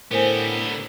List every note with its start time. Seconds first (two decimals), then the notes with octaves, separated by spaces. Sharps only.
0.11 A2 D3 B3 G4 A#4 C5 G#5